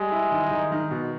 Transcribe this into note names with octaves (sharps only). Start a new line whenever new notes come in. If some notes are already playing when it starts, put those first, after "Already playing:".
Already playing: G3 G#3
E4
D#3
D#3
D#3
B2